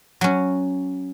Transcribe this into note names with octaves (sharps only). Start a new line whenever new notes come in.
F#3 C#4